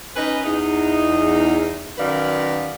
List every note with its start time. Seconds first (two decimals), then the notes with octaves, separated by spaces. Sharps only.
0.16 C#4 D#4 B4
0.45 E2 D#4
1.98 F#2 D#3 B4 D5 F5